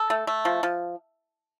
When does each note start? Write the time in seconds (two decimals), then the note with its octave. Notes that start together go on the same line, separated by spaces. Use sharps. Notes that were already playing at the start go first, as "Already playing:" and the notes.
Already playing: A4
0.10 A3
0.27 A3
0.45 F3
0.63 F3